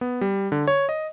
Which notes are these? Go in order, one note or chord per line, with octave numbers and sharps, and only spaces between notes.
B3
G3
D3
C#5
D#5